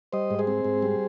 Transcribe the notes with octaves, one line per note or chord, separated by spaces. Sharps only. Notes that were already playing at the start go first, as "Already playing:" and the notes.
G3 C5 D#5
G#2
G#4 C5
C4
G#2
G3